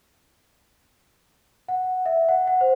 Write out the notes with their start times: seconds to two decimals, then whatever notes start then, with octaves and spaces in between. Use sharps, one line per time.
1.68 F#5
2.06 E5
2.29 F#5
2.48 F#5
2.61 C5